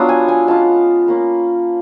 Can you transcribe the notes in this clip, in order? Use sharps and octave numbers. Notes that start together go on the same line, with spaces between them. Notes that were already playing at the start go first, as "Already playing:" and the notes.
Already playing: F#3 B3 D4 F4
G#5
G#5
G#3 C#4 F4 A5
A#3 C#4 F4